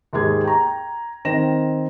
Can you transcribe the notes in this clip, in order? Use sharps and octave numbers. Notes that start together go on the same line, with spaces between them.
D#2 G#2 G4 G#4 G#6
G5 A#5
D#3 C4 A#6 E7